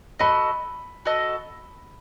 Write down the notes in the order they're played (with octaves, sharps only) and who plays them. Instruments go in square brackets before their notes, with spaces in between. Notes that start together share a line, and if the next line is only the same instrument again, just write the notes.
[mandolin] F#4 A4 D#5 [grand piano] B5
[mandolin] F#4 A4 D#5